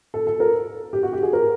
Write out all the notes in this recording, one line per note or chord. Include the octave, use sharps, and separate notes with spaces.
A4
A4
A#4
G4
F#4
G4
G#4
A#4